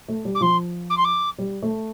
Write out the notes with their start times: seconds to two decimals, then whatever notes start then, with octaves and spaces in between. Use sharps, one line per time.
0.08 A3
0.25 G3
0.35 D6
0.41 F3 C6
0.90 D6
0.97 C6
1.04 D6
1.39 G3
1.62 A3